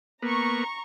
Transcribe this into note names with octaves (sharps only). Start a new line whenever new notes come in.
A#3 B3 A#5 C#6